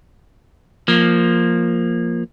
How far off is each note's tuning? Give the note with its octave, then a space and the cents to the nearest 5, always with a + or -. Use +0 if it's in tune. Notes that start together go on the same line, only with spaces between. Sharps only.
F3 +0 A#3 +0